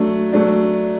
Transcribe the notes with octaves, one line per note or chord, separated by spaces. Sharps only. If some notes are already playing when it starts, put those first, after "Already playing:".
Already playing: F#3 A3 D4
F#3 A3 D4